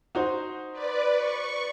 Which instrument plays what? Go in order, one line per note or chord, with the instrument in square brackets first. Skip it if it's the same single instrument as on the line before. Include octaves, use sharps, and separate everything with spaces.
[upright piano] D#4 F#4 C5
[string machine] B4 D5
C#6